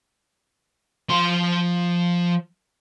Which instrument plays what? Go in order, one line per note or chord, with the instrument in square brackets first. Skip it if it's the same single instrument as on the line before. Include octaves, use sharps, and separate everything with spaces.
[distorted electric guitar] F3 C6